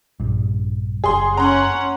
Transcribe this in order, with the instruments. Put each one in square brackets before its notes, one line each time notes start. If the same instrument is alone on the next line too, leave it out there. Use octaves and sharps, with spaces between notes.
[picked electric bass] A#1 G2
[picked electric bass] F#1 [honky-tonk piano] G#4 C6
[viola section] C#4 F#5 [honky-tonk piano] A#5 C6